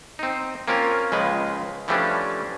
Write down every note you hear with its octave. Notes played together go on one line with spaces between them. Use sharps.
C4 D#4
A#3 C4 C#4 F4 A#4
C#2 C#3 F3 G#3 B4
E3 F3 G3 A3 C#4 D4